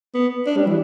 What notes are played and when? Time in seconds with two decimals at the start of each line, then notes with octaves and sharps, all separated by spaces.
0.14 B3
0.46 D4
0.56 G3
0.66 E3